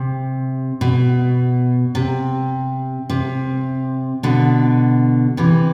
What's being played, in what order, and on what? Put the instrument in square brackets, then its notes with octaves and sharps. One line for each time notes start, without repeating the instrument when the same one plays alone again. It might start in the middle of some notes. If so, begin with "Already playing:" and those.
Already playing: [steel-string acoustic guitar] C3
B2
C3
C3
B2 D3
C3 E3